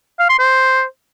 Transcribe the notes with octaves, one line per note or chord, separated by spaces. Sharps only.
F5
C6
C5